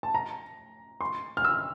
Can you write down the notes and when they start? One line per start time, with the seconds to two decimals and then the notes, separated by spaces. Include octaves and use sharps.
0.03 A5
0.14 A#5
1.01 C6
1.37 F6
1.45 E6